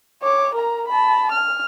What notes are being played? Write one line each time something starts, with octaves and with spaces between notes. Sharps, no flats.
C#5 D6
A#4 A#5
A5 B5
F6